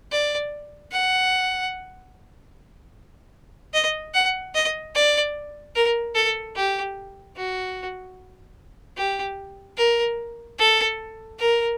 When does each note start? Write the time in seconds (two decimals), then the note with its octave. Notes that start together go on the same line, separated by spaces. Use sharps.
0.12 D5
0.92 F#5
3.74 D#5
4.14 F#5
4.54 D#5
4.95 D5
5.75 A#4
6.15 A4
6.56 G4
7.36 F#4
8.97 G4
9.77 A#4
10.59 A4
11.39 A#4